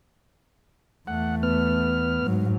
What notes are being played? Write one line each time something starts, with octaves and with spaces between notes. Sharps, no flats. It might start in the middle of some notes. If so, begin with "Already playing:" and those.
E2 A3 F#5
B3 F6
G#2 F#3